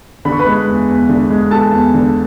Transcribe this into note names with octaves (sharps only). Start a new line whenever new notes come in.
D3 B5
C#6
B4 B5
G#3
E2
E2
D3
G#3
E2 A4 A5
E2
D3